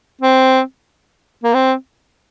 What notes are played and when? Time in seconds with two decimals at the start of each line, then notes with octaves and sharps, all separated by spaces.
0.21 C4
1.44 A#3
1.54 C4